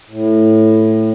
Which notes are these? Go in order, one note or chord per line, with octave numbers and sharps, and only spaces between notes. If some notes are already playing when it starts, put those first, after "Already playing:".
A2